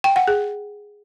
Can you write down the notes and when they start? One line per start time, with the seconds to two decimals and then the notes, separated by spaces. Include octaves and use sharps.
0.04 G5
0.16 F#5
0.28 G#4